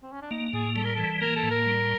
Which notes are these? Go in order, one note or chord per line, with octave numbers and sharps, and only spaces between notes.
C4
C#4
D4
A#3 D#4
A2 G#4
G3 A4
A#4
E3 A4
A#3 A#4
A4
A2
A#4
G3